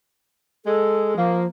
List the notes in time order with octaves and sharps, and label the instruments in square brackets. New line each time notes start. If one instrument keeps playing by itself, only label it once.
[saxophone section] G#3 [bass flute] A4
[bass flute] F3 [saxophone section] A#3